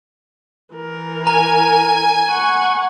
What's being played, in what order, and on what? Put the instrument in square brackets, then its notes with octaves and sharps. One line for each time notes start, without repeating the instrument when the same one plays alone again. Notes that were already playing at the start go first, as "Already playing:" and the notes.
[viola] E3 A#4
[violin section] G#5 G#6 [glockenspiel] A#5
[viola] F#5 C#6